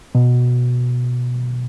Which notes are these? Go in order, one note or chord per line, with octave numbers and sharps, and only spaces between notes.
B2